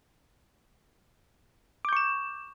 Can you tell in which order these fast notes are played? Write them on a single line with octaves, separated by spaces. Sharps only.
D6 G6 C#6 E7